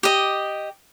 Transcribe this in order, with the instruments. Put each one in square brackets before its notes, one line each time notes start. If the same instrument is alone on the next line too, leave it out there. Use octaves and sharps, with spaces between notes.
[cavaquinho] G4 D#5